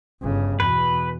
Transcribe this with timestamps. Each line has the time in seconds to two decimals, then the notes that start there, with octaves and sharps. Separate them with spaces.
0.22 G1 C#3
0.60 E2 B2 B4